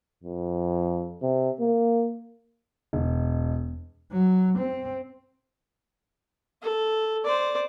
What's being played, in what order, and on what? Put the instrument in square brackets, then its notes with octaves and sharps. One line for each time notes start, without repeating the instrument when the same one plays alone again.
[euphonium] F2
C3
A#3
[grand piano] E1
[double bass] F#3
C4
[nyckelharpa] A4
C5 D5